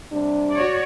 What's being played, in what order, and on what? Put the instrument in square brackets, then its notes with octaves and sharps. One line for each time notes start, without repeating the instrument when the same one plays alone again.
[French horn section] C3 G3 D4
[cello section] F#4 C#5 D5